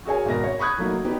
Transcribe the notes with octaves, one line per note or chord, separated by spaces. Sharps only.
F#4 G#4 A#4 C#5 G#5
G#1 B2 A#4 A#6
C#5
B5 C#6 D#6 F#6 G#6
F#3 A3 A#3 D#4
B3 D#4 G4